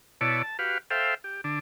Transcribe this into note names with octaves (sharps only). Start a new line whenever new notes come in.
B2 E4 C#5 D5 A5
A5
F#4 G4 B4 F5
A4 C5 E5 F5 G5
G4
D3 D4